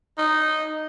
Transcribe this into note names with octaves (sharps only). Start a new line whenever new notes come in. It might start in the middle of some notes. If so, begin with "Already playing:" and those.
D#4